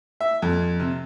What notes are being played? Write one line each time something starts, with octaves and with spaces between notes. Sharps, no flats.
E5
F2
C3